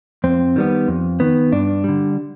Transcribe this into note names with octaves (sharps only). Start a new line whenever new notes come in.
F2 C4
D#3 G3 B3
F2
D#3 B3
G2 D4
D3 G3